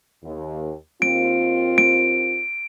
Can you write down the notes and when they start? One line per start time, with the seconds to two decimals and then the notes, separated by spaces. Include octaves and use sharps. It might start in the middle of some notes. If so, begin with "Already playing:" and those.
0.23 D#2
1.02 D#2 C4 F4 D7
1.78 D7